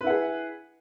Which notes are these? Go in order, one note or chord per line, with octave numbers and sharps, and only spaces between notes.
E4 G#4 B4 F#5